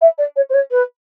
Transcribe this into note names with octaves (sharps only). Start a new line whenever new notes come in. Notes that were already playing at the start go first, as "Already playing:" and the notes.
E5
D5
C#5
C5
C#5
B4